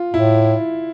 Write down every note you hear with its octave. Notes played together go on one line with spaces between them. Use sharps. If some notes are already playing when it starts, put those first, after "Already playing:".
Already playing: F4
A2 E4